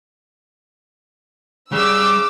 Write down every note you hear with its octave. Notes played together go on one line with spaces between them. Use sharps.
C#3 G3 D6 E6